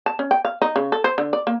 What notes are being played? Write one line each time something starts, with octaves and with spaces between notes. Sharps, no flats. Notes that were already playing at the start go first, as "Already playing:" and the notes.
A5
C#4
G5
F5
D#4
C#3
A4
C5
D3
D5
A#3